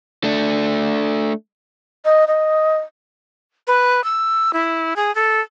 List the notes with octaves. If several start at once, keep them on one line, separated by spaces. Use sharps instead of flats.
A3 D4
D#5
D#5
B4
E6
E4
G#4
A4